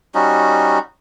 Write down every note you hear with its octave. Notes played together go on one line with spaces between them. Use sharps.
G3 C#4 D#4 F#4